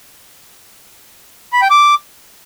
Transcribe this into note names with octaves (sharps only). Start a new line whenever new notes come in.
B5
G5
D6